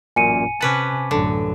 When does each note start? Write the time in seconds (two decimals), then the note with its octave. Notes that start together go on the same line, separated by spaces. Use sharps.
0.16 A1 F#2 A#2 G#5 C#7 D#7
0.61 C3 C#4 B4 F#5 A5 D6
1.11 A1 F#2 D3